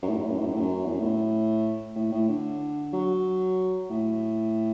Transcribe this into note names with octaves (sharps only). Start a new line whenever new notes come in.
F#2
A2
F#2
A2
F#2
A2
F#2
A2
F#2
E2
F#2
A2
A2
A2
D3
F#3
A2